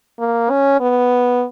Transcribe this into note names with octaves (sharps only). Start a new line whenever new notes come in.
A#3
C#4
B3